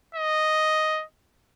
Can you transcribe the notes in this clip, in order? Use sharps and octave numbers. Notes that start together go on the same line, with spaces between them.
D#5